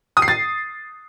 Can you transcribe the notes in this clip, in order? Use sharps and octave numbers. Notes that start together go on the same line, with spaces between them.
D#6
C7
A6